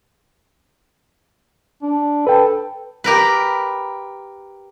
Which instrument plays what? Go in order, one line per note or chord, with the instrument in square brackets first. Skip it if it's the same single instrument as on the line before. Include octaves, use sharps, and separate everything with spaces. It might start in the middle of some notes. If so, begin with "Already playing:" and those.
[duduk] D4
[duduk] A4 [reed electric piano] B4 G5
[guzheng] G4 A#4 B4